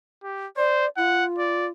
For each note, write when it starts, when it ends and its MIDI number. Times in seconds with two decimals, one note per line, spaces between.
0.24 0.47 67
0.57 0.86 72
0.57 0.89 74
0.97 1.69 65
0.97 1.25 78
1.38 1.67 74